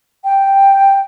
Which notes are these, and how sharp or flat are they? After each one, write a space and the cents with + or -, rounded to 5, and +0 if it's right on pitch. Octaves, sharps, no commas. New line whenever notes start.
G5 +0